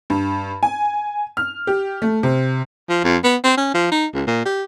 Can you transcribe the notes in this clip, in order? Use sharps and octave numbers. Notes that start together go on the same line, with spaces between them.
G2
G#5
F6
G4
A3
C3
F3
F2
B3
C4
C#4
F3
D#4
C#2
A#2
G4